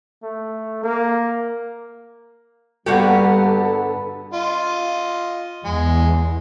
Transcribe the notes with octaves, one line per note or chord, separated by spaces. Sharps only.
A3
A#3
G2 D3 G3 A#3 B3 F#4 G4 A4
F4 D#5
E2 G#3